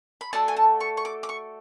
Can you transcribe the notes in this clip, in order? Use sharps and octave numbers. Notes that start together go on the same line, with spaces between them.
B5
A3 D4 F#4 A4 A5
G#5
A5
C#6
C#6
D6
D6
C#6